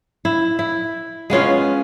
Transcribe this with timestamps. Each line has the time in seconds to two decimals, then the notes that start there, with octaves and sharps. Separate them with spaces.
0.25 E4
0.59 E4
1.30 G#3 B3 C#4 F4